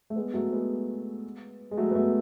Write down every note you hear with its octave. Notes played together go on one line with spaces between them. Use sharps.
A3
G#3 B3
F#3 A3
G#3 B3
G#3
F#3 A3
B3
F#3 A3